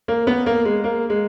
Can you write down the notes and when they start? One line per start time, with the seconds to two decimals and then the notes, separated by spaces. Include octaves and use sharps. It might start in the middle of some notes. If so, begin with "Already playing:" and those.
0.08 A#3
0.27 B3
0.46 A#3
0.65 G#3
0.84 A#3
1.10 G#3